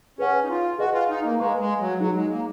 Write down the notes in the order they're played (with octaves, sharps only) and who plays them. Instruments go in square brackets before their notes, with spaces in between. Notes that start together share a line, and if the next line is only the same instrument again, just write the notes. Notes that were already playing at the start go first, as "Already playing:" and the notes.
[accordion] C#4 [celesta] G#4 B4 F#5
[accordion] D#4
F4
[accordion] F#4 [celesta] G#4 B4 D#5 G#5
[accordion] F4
D#4
A#3
[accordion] G#3 [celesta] B4 F5 A#5 C#6
[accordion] G#3
F#3
[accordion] F#3 [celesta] D#4 G#4 C#5
[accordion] G#3
A#3